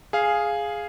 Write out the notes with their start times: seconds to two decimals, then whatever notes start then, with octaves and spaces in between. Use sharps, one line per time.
0.13 G#4 F5